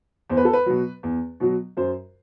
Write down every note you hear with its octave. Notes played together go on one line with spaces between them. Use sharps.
E2 C5
B4
A4
B4
B2 F#3
E2
B2 F#3
F#2 C5